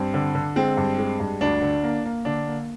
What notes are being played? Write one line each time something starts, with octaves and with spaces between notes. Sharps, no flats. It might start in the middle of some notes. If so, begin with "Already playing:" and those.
Already playing: G2 C4
D3
D3
G#3 C4
G2
G#3
G2
D2 D4
D3
A#3
A#3
D3 D4
A#3